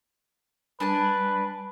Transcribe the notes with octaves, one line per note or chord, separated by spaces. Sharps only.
G3 D4 B4 G#5 A5